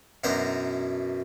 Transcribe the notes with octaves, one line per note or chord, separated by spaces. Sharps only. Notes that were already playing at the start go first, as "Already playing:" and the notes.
F#2 B2 E3 D4 C5 A#5